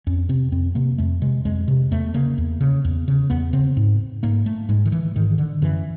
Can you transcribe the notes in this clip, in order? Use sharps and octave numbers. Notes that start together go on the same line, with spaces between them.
F2 C#4
C3 C4
F2 C4
C3 A#3
F2 A3
C3 G#3
F2 G#3
C3
E2 A3
C#3 A#3
E2
C#3
E2
C#3
E2 B3
C#3 C4
G#2
G#2 A#3
A3
G#2 G#3
D#3
E3
G#2 D#3
D3
F#2 E3